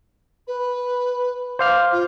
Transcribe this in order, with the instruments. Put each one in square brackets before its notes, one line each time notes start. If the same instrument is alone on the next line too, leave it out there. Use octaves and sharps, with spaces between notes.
[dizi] B4
[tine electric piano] C5 F5 F6 [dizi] D6
[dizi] F4